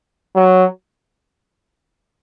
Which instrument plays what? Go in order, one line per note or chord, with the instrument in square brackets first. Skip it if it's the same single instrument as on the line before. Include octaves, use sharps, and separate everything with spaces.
[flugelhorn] F#3